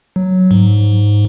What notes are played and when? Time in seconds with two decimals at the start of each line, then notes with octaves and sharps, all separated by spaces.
0.16 F#3
0.51 G#2